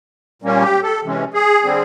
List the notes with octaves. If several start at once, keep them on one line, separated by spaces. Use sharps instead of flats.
A#2 G3 A#3 C#4
G4
A4
C3 E3 G#3 C#4
G#4
D3 G3 C4